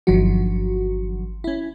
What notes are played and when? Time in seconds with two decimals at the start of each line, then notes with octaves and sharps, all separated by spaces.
0.07 G1 D#3 F3 F#3 F#4
1.44 C#4 E4